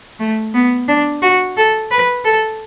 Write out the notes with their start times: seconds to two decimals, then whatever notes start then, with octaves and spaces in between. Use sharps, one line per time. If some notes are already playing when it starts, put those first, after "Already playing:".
0.19 A3
0.54 B3
0.88 D4
1.22 F#4
1.57 A4
1.91 B4
2.25 A4